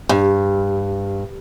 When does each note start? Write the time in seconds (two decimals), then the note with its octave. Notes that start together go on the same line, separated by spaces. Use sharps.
0.09 G2